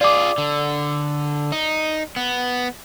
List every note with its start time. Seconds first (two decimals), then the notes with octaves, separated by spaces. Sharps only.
0.01 F4 G#4 D5 D6
0.38 D3
1.52 D#4
2.16 B3